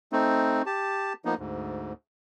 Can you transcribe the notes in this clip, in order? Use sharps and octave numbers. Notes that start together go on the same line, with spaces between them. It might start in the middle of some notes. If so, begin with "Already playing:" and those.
A3 C4 D#4
G4 A5
F3 A#3 B3 D#4
D2 G#2